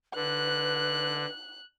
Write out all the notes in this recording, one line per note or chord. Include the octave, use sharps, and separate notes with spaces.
D3 B4 F#6